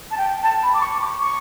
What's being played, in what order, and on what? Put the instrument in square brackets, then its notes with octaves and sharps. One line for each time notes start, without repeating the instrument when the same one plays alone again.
[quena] A5
G5
A5
B5
D6
C#6
D6
C#6